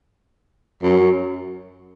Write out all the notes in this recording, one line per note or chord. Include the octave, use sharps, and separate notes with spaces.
F#2